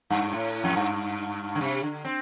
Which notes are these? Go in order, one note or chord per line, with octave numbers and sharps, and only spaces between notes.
G2
A2
F2
G2
D3
C3
D3
C4